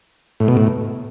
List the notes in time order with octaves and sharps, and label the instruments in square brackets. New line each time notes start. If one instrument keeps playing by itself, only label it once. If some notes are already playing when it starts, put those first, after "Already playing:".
[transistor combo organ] A2
B2
A2